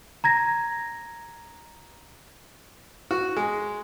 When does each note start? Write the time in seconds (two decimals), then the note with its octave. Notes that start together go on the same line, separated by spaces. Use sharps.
0.24 A#5 G#6 A#6
3.11 F#4
3.37 G#3